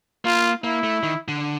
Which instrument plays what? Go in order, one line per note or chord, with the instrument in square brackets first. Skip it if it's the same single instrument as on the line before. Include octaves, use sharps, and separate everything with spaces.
[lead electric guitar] A#3 [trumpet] F4
[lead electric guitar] A#3 [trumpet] E4
[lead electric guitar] A3
D#3
D3